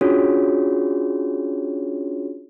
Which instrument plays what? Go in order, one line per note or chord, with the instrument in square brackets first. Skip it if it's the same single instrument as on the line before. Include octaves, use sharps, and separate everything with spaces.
[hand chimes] C#4 D4 F4 F#4 G#4 C#5